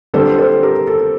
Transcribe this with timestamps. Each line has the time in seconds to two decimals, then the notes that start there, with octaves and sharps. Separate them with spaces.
0.14 D3 G3 C4 A4 C5
0.38 A4 C5
0.63 G4 A#4
0.87 A4